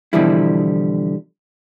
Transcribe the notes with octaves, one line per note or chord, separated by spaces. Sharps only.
B2 D3 E3 F3 G3 E4